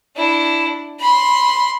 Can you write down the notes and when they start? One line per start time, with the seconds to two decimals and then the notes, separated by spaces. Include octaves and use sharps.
0.16 D4 E4
1.00 B5 C6